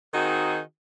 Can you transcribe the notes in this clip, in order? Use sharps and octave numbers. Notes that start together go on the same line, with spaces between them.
D#3 C4 D#4 F#4 G#4